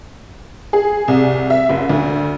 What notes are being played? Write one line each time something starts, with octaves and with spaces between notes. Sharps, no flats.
G#4
C2
E5
F#1
D2